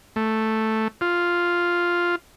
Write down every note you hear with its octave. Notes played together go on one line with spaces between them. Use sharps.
A3
F4